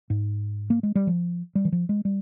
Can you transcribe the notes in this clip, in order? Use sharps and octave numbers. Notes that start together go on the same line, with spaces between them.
G#2
A#3
G#3
G3
F3
G3
E3
F3
G#3
G3